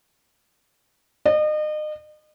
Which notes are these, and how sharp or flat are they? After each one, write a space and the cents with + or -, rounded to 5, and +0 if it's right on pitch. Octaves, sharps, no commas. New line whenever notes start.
D#5 -35